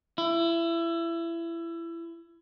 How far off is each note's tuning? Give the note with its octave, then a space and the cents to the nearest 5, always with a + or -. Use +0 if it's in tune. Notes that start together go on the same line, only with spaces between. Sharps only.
E4 +25